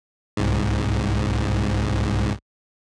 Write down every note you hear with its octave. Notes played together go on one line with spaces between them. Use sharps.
C2 G#2